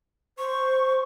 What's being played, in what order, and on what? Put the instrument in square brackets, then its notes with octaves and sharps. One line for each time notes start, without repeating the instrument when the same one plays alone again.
[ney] C5 [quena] C#6